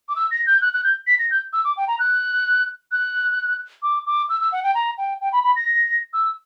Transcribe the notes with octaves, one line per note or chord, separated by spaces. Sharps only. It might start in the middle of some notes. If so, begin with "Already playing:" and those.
D6
E6
A#6
G6
F#6
F#6
G6
B6
A#6
G6
E6
D6
G5
A#5
F#6
F#6
D6
D6
E6
E6
F#5
G5
A#5
G5
G5
B5
B5
A#6
E6